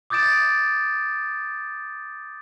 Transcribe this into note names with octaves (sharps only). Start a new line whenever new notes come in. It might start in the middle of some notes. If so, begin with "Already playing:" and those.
D6 D#6 G6 A6 D7 E7